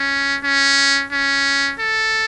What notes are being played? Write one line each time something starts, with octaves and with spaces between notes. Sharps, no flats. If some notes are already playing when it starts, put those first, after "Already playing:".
Already playing: C#4
C#4
C#4
A4